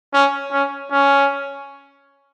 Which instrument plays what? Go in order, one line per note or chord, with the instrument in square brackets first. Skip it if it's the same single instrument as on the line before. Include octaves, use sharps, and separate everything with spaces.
[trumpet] C#4
C#4
C#4